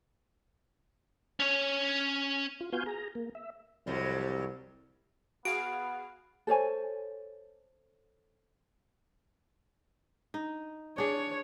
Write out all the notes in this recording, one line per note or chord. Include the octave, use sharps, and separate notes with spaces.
C#4 C#5
F4
B3 F4 F#4 F5 G#5 G6
G#4 A#5
A#3
E5
C2 F2 F#3 G3
B3 F#4 G#4 F5 D7
A4 C5 C#5 G#5
D#4
D4 G#4 C#5